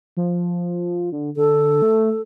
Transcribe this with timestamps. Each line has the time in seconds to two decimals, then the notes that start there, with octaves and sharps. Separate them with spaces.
0.17 F3
1.12 D3
1.37 D3 A4
1.82 A3